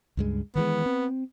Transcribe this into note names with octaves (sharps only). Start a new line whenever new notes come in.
C#2 G2 G#3
D#3 E3 G#3 B3
C4